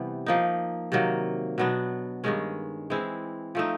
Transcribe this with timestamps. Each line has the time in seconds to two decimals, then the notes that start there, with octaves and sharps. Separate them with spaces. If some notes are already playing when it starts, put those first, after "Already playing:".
Already playing: C3 E3 G3 B3
0.26 F3 A#3 D#4
0.92 C3 D#3 F#3 A#3
1.58 B2 F#3 B3 D4
2.24 G2 D#3 G#3 C#4
2.90 E3 G#3 C4 E4
3.55 F3 A3 C4 D#4